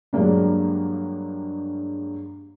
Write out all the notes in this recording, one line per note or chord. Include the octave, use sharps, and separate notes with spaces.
G2 F#3 G#3 A#3 D4